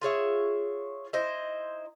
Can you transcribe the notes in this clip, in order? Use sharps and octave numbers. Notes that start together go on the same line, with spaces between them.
F4 G#4 C#5 E5
D#4 E4 C5 D#5